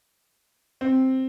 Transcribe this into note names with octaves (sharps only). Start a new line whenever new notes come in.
C4